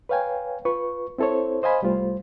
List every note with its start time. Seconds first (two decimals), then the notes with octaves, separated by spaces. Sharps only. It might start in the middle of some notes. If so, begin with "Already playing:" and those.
0.09 B4 C#5 F5 G5 G#5
0.65 F4 B4 C#6
1.18 C4 E4 A4 C5 C#5
1.63 C5 D#5 F5 G#5 B5
1.82 C2 G3 A3 F4 C5